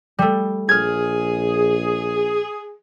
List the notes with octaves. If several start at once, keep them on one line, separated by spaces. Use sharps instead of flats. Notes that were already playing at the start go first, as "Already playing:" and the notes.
G3 A3
A#1 G#4 F6 G#6